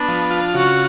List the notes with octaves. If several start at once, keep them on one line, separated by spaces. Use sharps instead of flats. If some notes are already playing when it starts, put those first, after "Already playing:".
Already playing: B3 D4
F3
F4
C#3 F#4